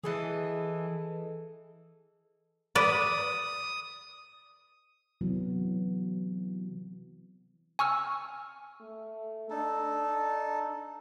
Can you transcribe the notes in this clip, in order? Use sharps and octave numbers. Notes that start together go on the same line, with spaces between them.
E3 G#4 A4 D#5
B4 D5 D#6
C3 E3 F#3 B3
G#5 C#6 E6 F6
A3
D4 D#4 A4